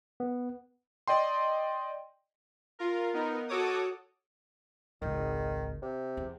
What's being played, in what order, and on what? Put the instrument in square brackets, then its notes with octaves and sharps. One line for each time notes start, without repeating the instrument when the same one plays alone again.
[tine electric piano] B3
[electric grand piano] D5 D#5 G5 C6
[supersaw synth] F4 A#4
B3 D#4 A#4
F#4 A4 C#5 D6 D#6
[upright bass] G#1 C#2 [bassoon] D#3
[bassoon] C3
[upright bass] E2